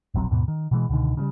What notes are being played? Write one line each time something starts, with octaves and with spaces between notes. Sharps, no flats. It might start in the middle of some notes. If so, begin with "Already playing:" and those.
E1 A#1 F#3 C4
D#2 G#2 B2
D#3
B2 E3 G#3
C#2 B2 D3 D#3
C#3 F3 G3